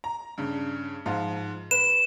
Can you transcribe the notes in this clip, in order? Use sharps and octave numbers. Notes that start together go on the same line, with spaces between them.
A#5
G2 C#3
G#2 F3 F4
B4 E7